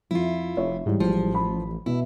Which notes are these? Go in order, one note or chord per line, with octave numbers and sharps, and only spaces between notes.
F2 E4 F4
F1 C#5 E5
G#2 E3 G3 G#3
A1 F3
B5
B2 E4